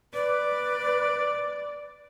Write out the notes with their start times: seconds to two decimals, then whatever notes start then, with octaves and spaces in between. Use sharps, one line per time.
0.14 B4 D5